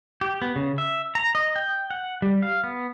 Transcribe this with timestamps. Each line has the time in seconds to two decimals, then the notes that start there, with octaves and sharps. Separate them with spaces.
0.21 G4
0.42 B3
0.56 C#3
0.78 E5
1.15 A#5
1.35 D#5
1.56 G5
1.90 F#5
2.22 G3
2.42 F5
2.64 B3